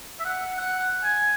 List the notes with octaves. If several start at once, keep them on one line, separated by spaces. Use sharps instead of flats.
E5
F#5
F#5
G#5